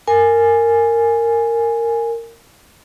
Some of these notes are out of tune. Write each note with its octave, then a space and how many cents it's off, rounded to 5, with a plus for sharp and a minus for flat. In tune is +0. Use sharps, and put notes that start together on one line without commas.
A#4 -15 G#5 +0